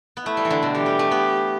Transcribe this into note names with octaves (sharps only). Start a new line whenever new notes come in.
B3
A3 E4
G3
E3
D3
B2
E3 G4
G3
A3
B3